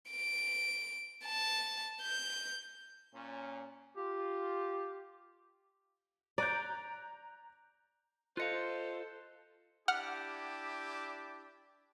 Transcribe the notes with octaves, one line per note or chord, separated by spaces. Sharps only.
D7
A5
G6
A#2 C#4
F4 G4
D5 A#5 F#6 G6
F4 A4 C5 D#5 F5 F#6 C#7
D4 E4 G4 F#5 F6